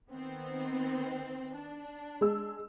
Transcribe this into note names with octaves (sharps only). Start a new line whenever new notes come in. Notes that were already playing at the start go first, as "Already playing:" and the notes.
D#3 B3 C4
D4
G#3 G#4 E6